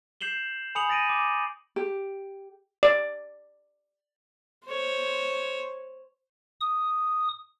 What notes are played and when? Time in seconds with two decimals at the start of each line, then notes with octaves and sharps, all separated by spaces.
0.21 G6 C7 E7 F#7 G7
0.75 G#5 B5 D#6 C#7 F7 F#7
0.90 A6 A#6 D7 D#7 F7
1.09 D6
1.76 G4
2.83 D5
4.66 C5 C#5
6.61 D#6